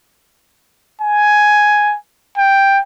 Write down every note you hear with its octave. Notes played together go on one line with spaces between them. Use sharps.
G#5
G5